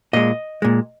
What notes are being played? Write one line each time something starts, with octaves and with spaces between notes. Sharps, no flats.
A#2 G#3 D#5
A#2 G#3